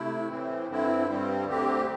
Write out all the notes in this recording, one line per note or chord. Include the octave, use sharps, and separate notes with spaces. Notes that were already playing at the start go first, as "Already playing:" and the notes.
Already playing: C3 A3 E4
A2 E3 C4
G2 D3 C4 E4
G2 G3 C4
D2 D3 C4 G4